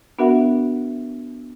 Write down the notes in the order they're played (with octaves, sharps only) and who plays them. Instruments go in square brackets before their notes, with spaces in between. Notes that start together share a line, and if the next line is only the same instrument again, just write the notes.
[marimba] B3 D4 F#4 A#4 E5 F#5